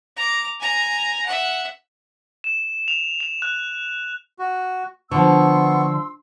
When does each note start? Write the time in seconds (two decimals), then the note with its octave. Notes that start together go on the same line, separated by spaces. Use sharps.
0.17 A#5 D6
0.60 G#5 A#5
1.25 E5 F#5
2.44 E7
2.88 F7
3.20 F7
3.42 F#6
4.39 F#4
5.11 D3 F3 B3 C6 C#6 E6